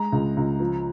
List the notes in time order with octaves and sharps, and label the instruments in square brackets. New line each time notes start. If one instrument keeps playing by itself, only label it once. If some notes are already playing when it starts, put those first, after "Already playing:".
Already playing: [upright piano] G#3 A#5
C#2
C#2
F3